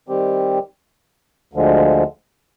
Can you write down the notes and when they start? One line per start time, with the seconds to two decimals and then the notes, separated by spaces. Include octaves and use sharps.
0.09 D#3 G3 C4 G4
1.53 D2 D3 F3 G#3